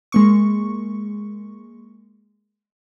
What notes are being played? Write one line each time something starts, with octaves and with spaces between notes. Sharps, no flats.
G#3 A#3 C#6